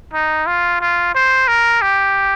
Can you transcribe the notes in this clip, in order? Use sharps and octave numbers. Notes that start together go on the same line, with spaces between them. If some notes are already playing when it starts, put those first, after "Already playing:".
D#4
F4
F4
C5
A#4
G4